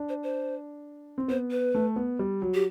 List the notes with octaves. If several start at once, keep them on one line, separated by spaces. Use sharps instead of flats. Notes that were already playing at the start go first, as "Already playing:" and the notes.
Already playing: D4
C5
C5
C4
B3 C5
B4
A3
B3
G3
F#3
G4